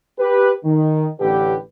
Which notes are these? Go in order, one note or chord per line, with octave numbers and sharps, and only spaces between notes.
G4 B4
D#3
A1 D3 G4 B4